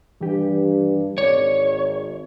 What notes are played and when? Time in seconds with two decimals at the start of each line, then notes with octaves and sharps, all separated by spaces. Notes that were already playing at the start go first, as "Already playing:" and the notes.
0.21 G2 E3 G4
1.18 G#1 C#5 D5